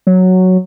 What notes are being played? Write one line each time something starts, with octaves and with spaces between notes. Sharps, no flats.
F#3